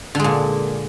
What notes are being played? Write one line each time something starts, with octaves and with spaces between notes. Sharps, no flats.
A#2 D3 G#3